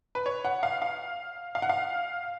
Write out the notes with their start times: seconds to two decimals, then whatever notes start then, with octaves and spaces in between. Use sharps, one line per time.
0.15 B4
0.26 C#5
0.45 F#5
0.63 F5
0.82 F5
1.55 F5
1.62 F#5
1.69 F5